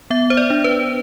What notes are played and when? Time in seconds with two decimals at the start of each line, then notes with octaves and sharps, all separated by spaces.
0.10 B3 E5
0.30 C5
0.37 D5
0.50 D4
0.64 B4